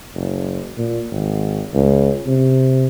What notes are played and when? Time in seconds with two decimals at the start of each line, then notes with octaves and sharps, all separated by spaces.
0.15 F#1
0.77 A#2
1.11 G#1
1.74 C#2
2.27 C3